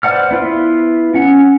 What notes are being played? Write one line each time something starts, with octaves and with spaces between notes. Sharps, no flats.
B4 C5 D5 F#5 F6
B3 E4 F4 B4
C#4 F#5